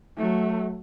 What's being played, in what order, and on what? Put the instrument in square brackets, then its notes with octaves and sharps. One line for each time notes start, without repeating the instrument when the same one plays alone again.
[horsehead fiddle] F#3 A3